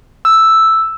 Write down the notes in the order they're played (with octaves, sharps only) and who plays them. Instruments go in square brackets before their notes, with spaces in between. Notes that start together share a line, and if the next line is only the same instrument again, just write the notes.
[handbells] E6